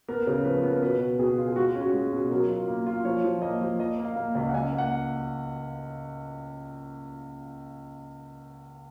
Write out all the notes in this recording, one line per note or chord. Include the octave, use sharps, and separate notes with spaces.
B3 A#4
C#3
F3 B4
B3
A#4
B2 B4
B2
B2 G#4
F4
G#4
G#3 F#4
C#4
F#4
G#3
B2
F#3 A#4
F4
A#3
F4
F3 C#5
F3
A#3 D#5
F3
A#3 D#5
A#3
F5
A#3
C#2
F#5
C#2 G#5
A#3
F#5